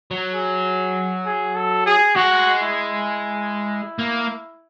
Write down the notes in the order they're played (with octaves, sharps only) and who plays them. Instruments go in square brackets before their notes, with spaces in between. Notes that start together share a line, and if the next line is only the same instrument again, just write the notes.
[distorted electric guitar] F#3
[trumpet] G#4
G#4
A4
G#4
[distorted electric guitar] G#3 [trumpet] F#4
[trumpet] E4
[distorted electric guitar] A#3